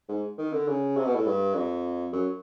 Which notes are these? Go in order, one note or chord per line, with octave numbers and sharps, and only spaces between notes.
G#2
D#3
D3
C#3
C3
B2
A2
G2
F2
F#2